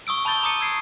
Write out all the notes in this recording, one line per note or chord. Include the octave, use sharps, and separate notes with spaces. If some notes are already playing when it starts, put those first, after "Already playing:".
C#6 D#6 E6 D7
A5 B5 C#6 G6 A6 G7
A#5 D6 D#6 C#7 D#7
E6 G#6 C7 D7